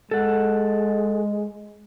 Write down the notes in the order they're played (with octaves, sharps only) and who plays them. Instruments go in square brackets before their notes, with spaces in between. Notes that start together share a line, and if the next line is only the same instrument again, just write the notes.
[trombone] G#3 [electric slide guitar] A4 F#5